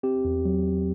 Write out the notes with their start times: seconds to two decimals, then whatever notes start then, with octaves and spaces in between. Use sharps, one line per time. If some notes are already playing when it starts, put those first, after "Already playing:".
0.03 C4 G4
0.25 E2
0.45 F#3